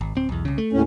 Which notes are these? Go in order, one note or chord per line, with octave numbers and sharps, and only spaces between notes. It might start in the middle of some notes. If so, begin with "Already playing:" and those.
G#1
D1 C4
B1 E2
C2 C#3
A3
D#2 A2 C#4